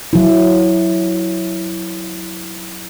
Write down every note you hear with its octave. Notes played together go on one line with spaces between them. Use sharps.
F#3 E4